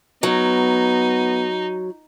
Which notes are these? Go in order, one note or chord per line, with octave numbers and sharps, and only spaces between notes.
F#3 B3 D#4